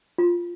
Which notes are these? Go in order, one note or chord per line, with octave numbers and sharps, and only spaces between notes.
F4